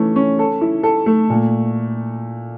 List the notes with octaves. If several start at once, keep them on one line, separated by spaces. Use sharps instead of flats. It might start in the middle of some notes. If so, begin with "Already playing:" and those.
Already playing: E3 A3 C#4
C#4
A4
E4
A4
A3
A#2